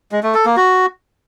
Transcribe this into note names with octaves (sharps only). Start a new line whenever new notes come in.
G#3
A3
A4
A#3
F#4